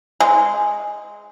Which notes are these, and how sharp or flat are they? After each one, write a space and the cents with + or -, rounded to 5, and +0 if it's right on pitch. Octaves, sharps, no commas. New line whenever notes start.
G#3 -5